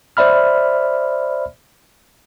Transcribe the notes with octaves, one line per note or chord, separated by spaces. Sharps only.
C5 D5 E5 B5 F6